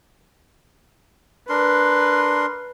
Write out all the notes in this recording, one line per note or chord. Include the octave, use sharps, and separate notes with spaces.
D4 A#4 B4 C6